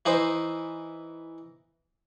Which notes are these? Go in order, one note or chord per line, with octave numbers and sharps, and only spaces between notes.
E3 D#4 C5